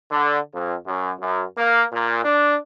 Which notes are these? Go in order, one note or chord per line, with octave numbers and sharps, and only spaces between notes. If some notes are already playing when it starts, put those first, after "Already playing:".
D3
F2
F#2
F#2
A#3
A#2
D4